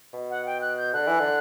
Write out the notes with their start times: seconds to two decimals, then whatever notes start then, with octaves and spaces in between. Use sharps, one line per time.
0.13 B2
0.30 F#5
0.46 G5
0.61 F#6
0.78 G6
0.93 D3 F#6
1.07 E3
1.20 D3